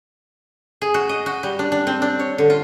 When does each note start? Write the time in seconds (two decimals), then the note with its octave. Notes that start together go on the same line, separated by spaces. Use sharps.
0.82 G#4
0.94 F#4
1.09 D#5
1.26 F#4
1.43 G3
1.59 D4
1.72 D4
1.87 C4
2.02 D4
2.19 C#5
2.38 D3
2.50 F4